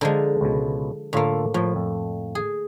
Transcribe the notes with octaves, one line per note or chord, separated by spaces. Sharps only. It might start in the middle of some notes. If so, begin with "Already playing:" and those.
D3 F3 G#3 D4 A4 A#5
C#2 B2
A2 D3 A#3 F4 A4
A2 F3
F2
G#4